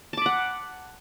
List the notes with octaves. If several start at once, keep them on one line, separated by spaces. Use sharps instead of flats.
F#5 A5 B5 D6